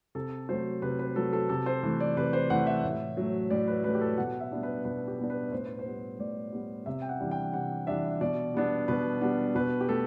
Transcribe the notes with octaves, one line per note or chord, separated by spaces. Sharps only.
C3 A4
F#3 A3 C5
C3 B4
B4
F#3 A3 A4
A4
C3 A4
C5
E3 A3
D5
C3 B4
C5
E3 A3 F#5
E5
A2
F#3 A3
A2 D5
B4
F#3 A3 B4
G4
A4
B2 F#5
E5
G3 B3 D4
B4
B2 B4
G4
G3 B3 D4
B4
A2 C5
B4
C5
G3 B3
A2 D5
G3 B3
C3 E5
G5
F#5
E3 G3 D4
G5
C3 F#5
E3 G3 D4 E5
B2 D5
G3 B3 D4
B2 B4
G3 B3 D4
B2 B4
G4
A3 A4